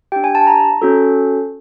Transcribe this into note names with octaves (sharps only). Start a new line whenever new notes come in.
D4 G4 G5
G#5
A5
A#5
C#4 F#4 A4